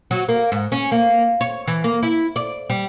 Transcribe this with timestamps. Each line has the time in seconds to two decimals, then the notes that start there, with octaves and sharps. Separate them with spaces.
0.11 F#3
0.29 A#3
0.52 G#2
0.72 C#4
0.92 A#3
1.41 C#5
1.67 E3
1.84 A#3
2.03 E4
2.36 D5
2.70 G3